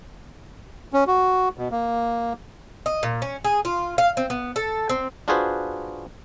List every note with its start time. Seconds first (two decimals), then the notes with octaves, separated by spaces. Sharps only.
0.93 C#4
1.07 F#4
1.57 B2
1.71 A#3
2.86 D#5
3.03 A#2
3.22 C#4
3.44 G#4
3.65 F4
3.98 F5
4.17 C4
4.30 B3
4.56 A4
4.89 C4
5.28 D4 F4 F#4 G#4 B4 C5